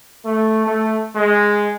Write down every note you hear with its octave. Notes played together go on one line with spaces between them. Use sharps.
A3
A3
G#3